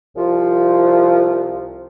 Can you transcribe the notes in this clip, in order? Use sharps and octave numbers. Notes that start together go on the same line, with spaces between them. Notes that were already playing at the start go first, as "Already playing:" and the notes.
C2 F3